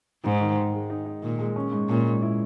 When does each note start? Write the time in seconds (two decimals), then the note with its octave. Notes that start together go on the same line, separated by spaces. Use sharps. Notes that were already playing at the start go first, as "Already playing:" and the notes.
0.24 G#2 D#4
0.41 D#3
0.56 D#3
0.73 G#3
0.90 D#4
1.06 D#4
1.22 A#2 D#3
1.39 G#3
1.56 C#4
1.72 G#2
1.89 A#2 C#4
2.05 G#2
2.22 E4